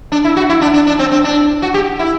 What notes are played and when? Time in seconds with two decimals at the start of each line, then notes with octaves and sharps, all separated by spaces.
0.12 D4
0.24 E4
0.36 F#4
0.50 E4
0.61 D4
0.74 D4
0.87 D4
0.99 C4
1.12 C4
1.24 D4
1.62 F#4
1.74 G4
1.99 E4